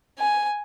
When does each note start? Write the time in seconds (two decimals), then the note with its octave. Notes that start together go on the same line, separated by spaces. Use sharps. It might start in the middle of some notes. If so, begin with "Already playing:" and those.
0.19 G#5